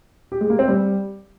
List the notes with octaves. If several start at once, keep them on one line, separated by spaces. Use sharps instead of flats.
G4
G#3
A#3
C4
G3